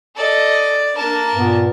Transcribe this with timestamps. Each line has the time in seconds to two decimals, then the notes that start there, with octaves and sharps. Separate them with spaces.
0.17 A4 D5 D#5
0.97 A#3 D4 A#4 A5
1.35 G2 A#2 B3